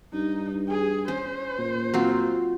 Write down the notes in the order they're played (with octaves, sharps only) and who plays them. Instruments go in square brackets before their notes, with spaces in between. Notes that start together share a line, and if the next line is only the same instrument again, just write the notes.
[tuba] G2 [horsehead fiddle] D#4
[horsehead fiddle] G#4
[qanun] C#4 [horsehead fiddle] C5
[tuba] A#2
[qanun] F#3 C4 F4